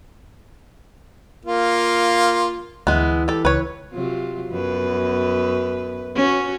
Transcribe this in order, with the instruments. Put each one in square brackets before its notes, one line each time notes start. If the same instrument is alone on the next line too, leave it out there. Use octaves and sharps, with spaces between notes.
[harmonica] A#3 F4
[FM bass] D2 [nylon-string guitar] E3 E4 [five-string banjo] G#3 B3
[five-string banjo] G4 A4
[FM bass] C#2 [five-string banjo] B4 C#5
[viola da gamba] C3 F#3 F4
F#2 B3 B4
C#4 F#4